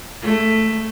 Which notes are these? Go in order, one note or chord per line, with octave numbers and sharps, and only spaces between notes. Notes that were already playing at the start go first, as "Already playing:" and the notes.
A3